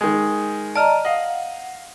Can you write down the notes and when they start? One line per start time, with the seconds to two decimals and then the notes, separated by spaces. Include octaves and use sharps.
0.01 D#3 G#3
0.75 D5 D#5 A5 A#5 F6
1.05 D#5 F5 F#5